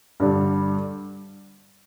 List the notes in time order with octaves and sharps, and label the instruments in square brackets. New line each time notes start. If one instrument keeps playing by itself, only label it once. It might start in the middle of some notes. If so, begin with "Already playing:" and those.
[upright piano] G2 D3 G3